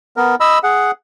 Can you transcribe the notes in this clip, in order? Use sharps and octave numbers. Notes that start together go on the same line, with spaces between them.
B3 A#4
D#5 B5 E6
G#4 F#5